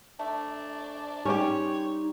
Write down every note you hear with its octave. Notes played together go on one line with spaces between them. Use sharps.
A3 D4
G3 C#4 D#4 G4 C#5 D5